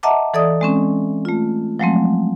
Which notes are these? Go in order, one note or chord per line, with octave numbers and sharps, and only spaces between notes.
D#5 E5 F#5 A5 A#5 D6
E3 A4 D5 E5 D#6
G#3 C4 C#4
A3 F4
F3 F#3 G#3 A3 C4